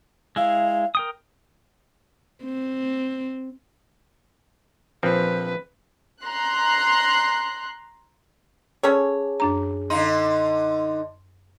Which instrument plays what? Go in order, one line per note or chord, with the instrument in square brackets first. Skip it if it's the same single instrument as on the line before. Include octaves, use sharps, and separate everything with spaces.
[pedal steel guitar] G#3 E4 [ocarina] F5
[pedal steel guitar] A#4 G5 D#6
[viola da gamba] C4
[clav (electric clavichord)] A#1 F3 C4 [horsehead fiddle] B4
[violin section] A#5 C6 F#6
[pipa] C#4 A4 C#5 [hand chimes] G#4
[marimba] F#2 D4 A#5
[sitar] D3 D#4 [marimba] D#5 F5 [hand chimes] C6